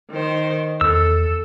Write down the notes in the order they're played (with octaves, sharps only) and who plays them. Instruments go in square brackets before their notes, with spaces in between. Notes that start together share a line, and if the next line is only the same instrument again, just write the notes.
[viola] D#3 C5
[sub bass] E2 [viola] A4 [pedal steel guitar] E6